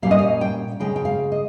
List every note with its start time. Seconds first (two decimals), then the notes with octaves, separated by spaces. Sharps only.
0.02 A#2 G3 C#4 F5
0.11 D#5
0.19 F5
0.41 G5
0.80 C#3 G#3 C#4 G5
0.96 G5
1.05 F5
1.32 D#5